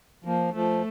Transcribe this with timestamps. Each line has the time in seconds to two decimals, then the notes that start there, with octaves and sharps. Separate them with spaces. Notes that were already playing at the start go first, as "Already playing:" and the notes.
0.24 F3 A#3
0.54 F3 A3